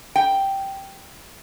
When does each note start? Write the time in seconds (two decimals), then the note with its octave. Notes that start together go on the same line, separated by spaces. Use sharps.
0.16 G5